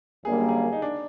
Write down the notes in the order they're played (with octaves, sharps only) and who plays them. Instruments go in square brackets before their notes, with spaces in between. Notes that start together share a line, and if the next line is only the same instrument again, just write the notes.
[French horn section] F#2 D3 G3 A#3 [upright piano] G#4
[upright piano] G#4
D#4
D4